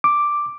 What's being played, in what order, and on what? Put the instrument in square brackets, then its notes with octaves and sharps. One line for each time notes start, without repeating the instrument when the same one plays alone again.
[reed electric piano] D6